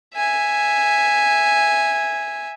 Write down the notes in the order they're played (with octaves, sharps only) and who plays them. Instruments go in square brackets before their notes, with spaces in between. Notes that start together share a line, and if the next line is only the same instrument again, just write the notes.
[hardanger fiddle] E5 G#5